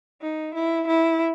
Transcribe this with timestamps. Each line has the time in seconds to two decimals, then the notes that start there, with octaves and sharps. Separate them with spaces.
0.21 D#4
0.54 E4
0.87 E4